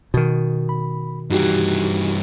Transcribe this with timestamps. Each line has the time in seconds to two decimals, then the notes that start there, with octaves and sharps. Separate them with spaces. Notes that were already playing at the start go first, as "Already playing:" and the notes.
0.14 B2 D#3
0.69 B5
1.30 G2 E3 D#4 F#4 G4